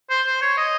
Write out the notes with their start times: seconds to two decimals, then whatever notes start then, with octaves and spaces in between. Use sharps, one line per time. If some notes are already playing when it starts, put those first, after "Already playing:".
0.10 C5
0.26 C5
0.42 C#5
0.58 D#5